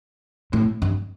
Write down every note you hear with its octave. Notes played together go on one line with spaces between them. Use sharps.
A2
G2